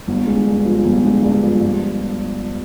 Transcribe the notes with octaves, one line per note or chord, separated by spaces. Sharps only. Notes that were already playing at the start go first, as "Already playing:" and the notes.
G1
G#3
G2
F3
G1
G#3
G2
F3
G2